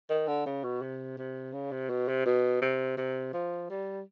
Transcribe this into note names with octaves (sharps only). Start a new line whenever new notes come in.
D#3
D3
C#3
B2
C3
C3
C#3
C3
B2
C3
B2
C3
C3
F3
G3